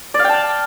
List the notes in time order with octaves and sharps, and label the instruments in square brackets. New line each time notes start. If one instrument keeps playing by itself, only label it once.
[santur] D5
F5
G5
A5